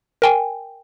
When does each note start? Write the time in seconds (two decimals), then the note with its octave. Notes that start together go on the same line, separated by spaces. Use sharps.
0.22 A#4 G5 G#5